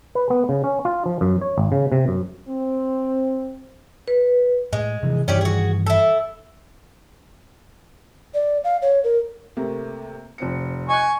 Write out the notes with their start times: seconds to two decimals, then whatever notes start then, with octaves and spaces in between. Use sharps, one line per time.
0.15 B4
0.30 B3
0.49 C#3
0.64 C#4
0.85 F4
1.06 F3
1.21 F#2
1.41 C#5
1.58 G#1
1.72 C#3
1.92 C3
2.08 F#2
2.49 C4
4.08 B4
4.73 A2 G#3
5.03 C3 E3 F3
5.28 G2 D#3 E3 C#4 G4 D5
5.41 F#4 G#4
5.86 E4 A4
8.34 D5
8.64 F5
8.82 C#5
9.04 A#4
9.57 C3 A3 A#3
10.38 F1 C4 C#7
10.89 D#5 G#5 C#6 F#6